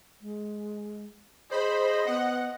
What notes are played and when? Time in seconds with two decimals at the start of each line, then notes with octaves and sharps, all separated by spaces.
0.21 G#3
1.51 G#4 C5 D#5 B5
2.07 B3 F#5